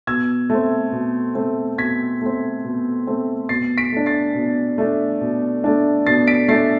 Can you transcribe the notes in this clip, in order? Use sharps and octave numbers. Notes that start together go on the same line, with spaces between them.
B2 E6 G#6
A3 C4
B2
A3 C4
B2 G#6 B6
A3 C4
B2
A3 C4
B2 A6 C7
B6 D7
A3 D4
A6 C7
B2
A3 D4
B2
A3 D4
B2 A6 C7
B6 D7
A3 D4 A6 C7